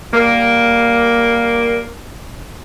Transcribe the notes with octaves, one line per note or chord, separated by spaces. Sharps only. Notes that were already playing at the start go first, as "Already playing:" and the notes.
G3 A#3